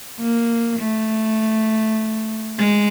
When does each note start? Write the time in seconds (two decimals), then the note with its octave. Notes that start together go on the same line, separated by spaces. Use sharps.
0.19 A#3
0.79 A3
2.59 G#3